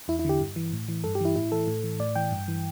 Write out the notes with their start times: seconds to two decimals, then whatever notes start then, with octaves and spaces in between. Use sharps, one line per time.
0.08 E2 E4
0.19 E4
0.25 D3 G4
0.40 G2
0.56 E3
0.73 A2
0.89 E3
1.04 G2 A4
1.15 G4
1.21 E3 E4
1.36 A2 E4
1.52 E3 A4
1.68 A2
1.84 E3
2.00 A2 D5
2.16 E3 G5
2.31 G2
2.48 E3